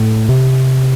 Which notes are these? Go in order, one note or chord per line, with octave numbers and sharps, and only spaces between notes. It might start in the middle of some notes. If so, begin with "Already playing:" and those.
Already playing: A2
C3